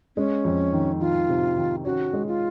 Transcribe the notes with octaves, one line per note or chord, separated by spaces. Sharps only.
G#3 C#4
F2
D#3
D#3 F4
C3
D#3
C#4 F#4
G#3
F4